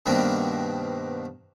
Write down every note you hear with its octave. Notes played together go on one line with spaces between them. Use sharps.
G2 B2 D#3 A#3 C4